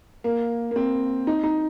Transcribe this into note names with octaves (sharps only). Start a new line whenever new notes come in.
A#3
A#3
C4
D#4
D#4